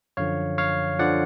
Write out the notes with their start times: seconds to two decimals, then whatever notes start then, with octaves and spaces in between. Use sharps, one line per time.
0.17 F#2 D3 F3 C#5 F5
0.58 C#5 F5
0.99 D3 F3 D5 F#5